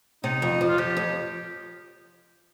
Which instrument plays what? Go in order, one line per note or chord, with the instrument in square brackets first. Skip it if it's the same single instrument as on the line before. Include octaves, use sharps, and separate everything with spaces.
[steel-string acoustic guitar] C3 [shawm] D#4
[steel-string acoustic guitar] F2
F3
[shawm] F4
[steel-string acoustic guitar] F2 [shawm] G4
[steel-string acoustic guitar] F2